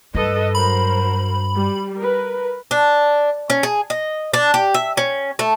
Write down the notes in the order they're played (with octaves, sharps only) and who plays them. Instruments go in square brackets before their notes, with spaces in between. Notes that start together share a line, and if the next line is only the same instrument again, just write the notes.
[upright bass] G2 [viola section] A4 B4 D#5
[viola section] F#3 A#4 C5 [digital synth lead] B5
[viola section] G3
A#4 B4
[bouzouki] D4
C#4
G#4
D#5
D4
G4
E5
C#4
A3